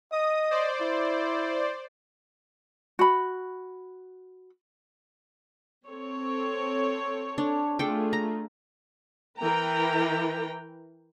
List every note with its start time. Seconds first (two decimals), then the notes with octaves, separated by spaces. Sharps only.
0.12 D#5 D#6
0.51 C5 D5
0.81 E4
2.99 F#4 B5
5.87 C4 A4 C#5
7.38 D4
7.79 A3 D4 F4 G#4 A4 G5
8.13 A#5
9.39 E3 A#4 B4 G5 A#5